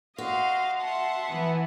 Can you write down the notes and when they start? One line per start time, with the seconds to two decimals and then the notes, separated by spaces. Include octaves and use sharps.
0.18 F#4 D#5 F5 C6
0.81 E5 F#5 A5 C6
1.30 E3 B3